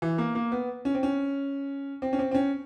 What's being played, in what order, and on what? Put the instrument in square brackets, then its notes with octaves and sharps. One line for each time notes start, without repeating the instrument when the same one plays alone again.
[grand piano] E3
A#3
A#3
B3
C#4
C4
C#4
C4
C#4
C4
C4
C#4